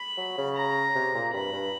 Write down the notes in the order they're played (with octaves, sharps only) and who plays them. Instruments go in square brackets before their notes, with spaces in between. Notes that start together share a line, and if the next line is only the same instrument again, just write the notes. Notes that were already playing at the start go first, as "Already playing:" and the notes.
Already playing: [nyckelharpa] B5
[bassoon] F#3
C#3
[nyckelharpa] A#5
[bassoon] C3
A#2
[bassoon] G2 [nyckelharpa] B5
[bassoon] G2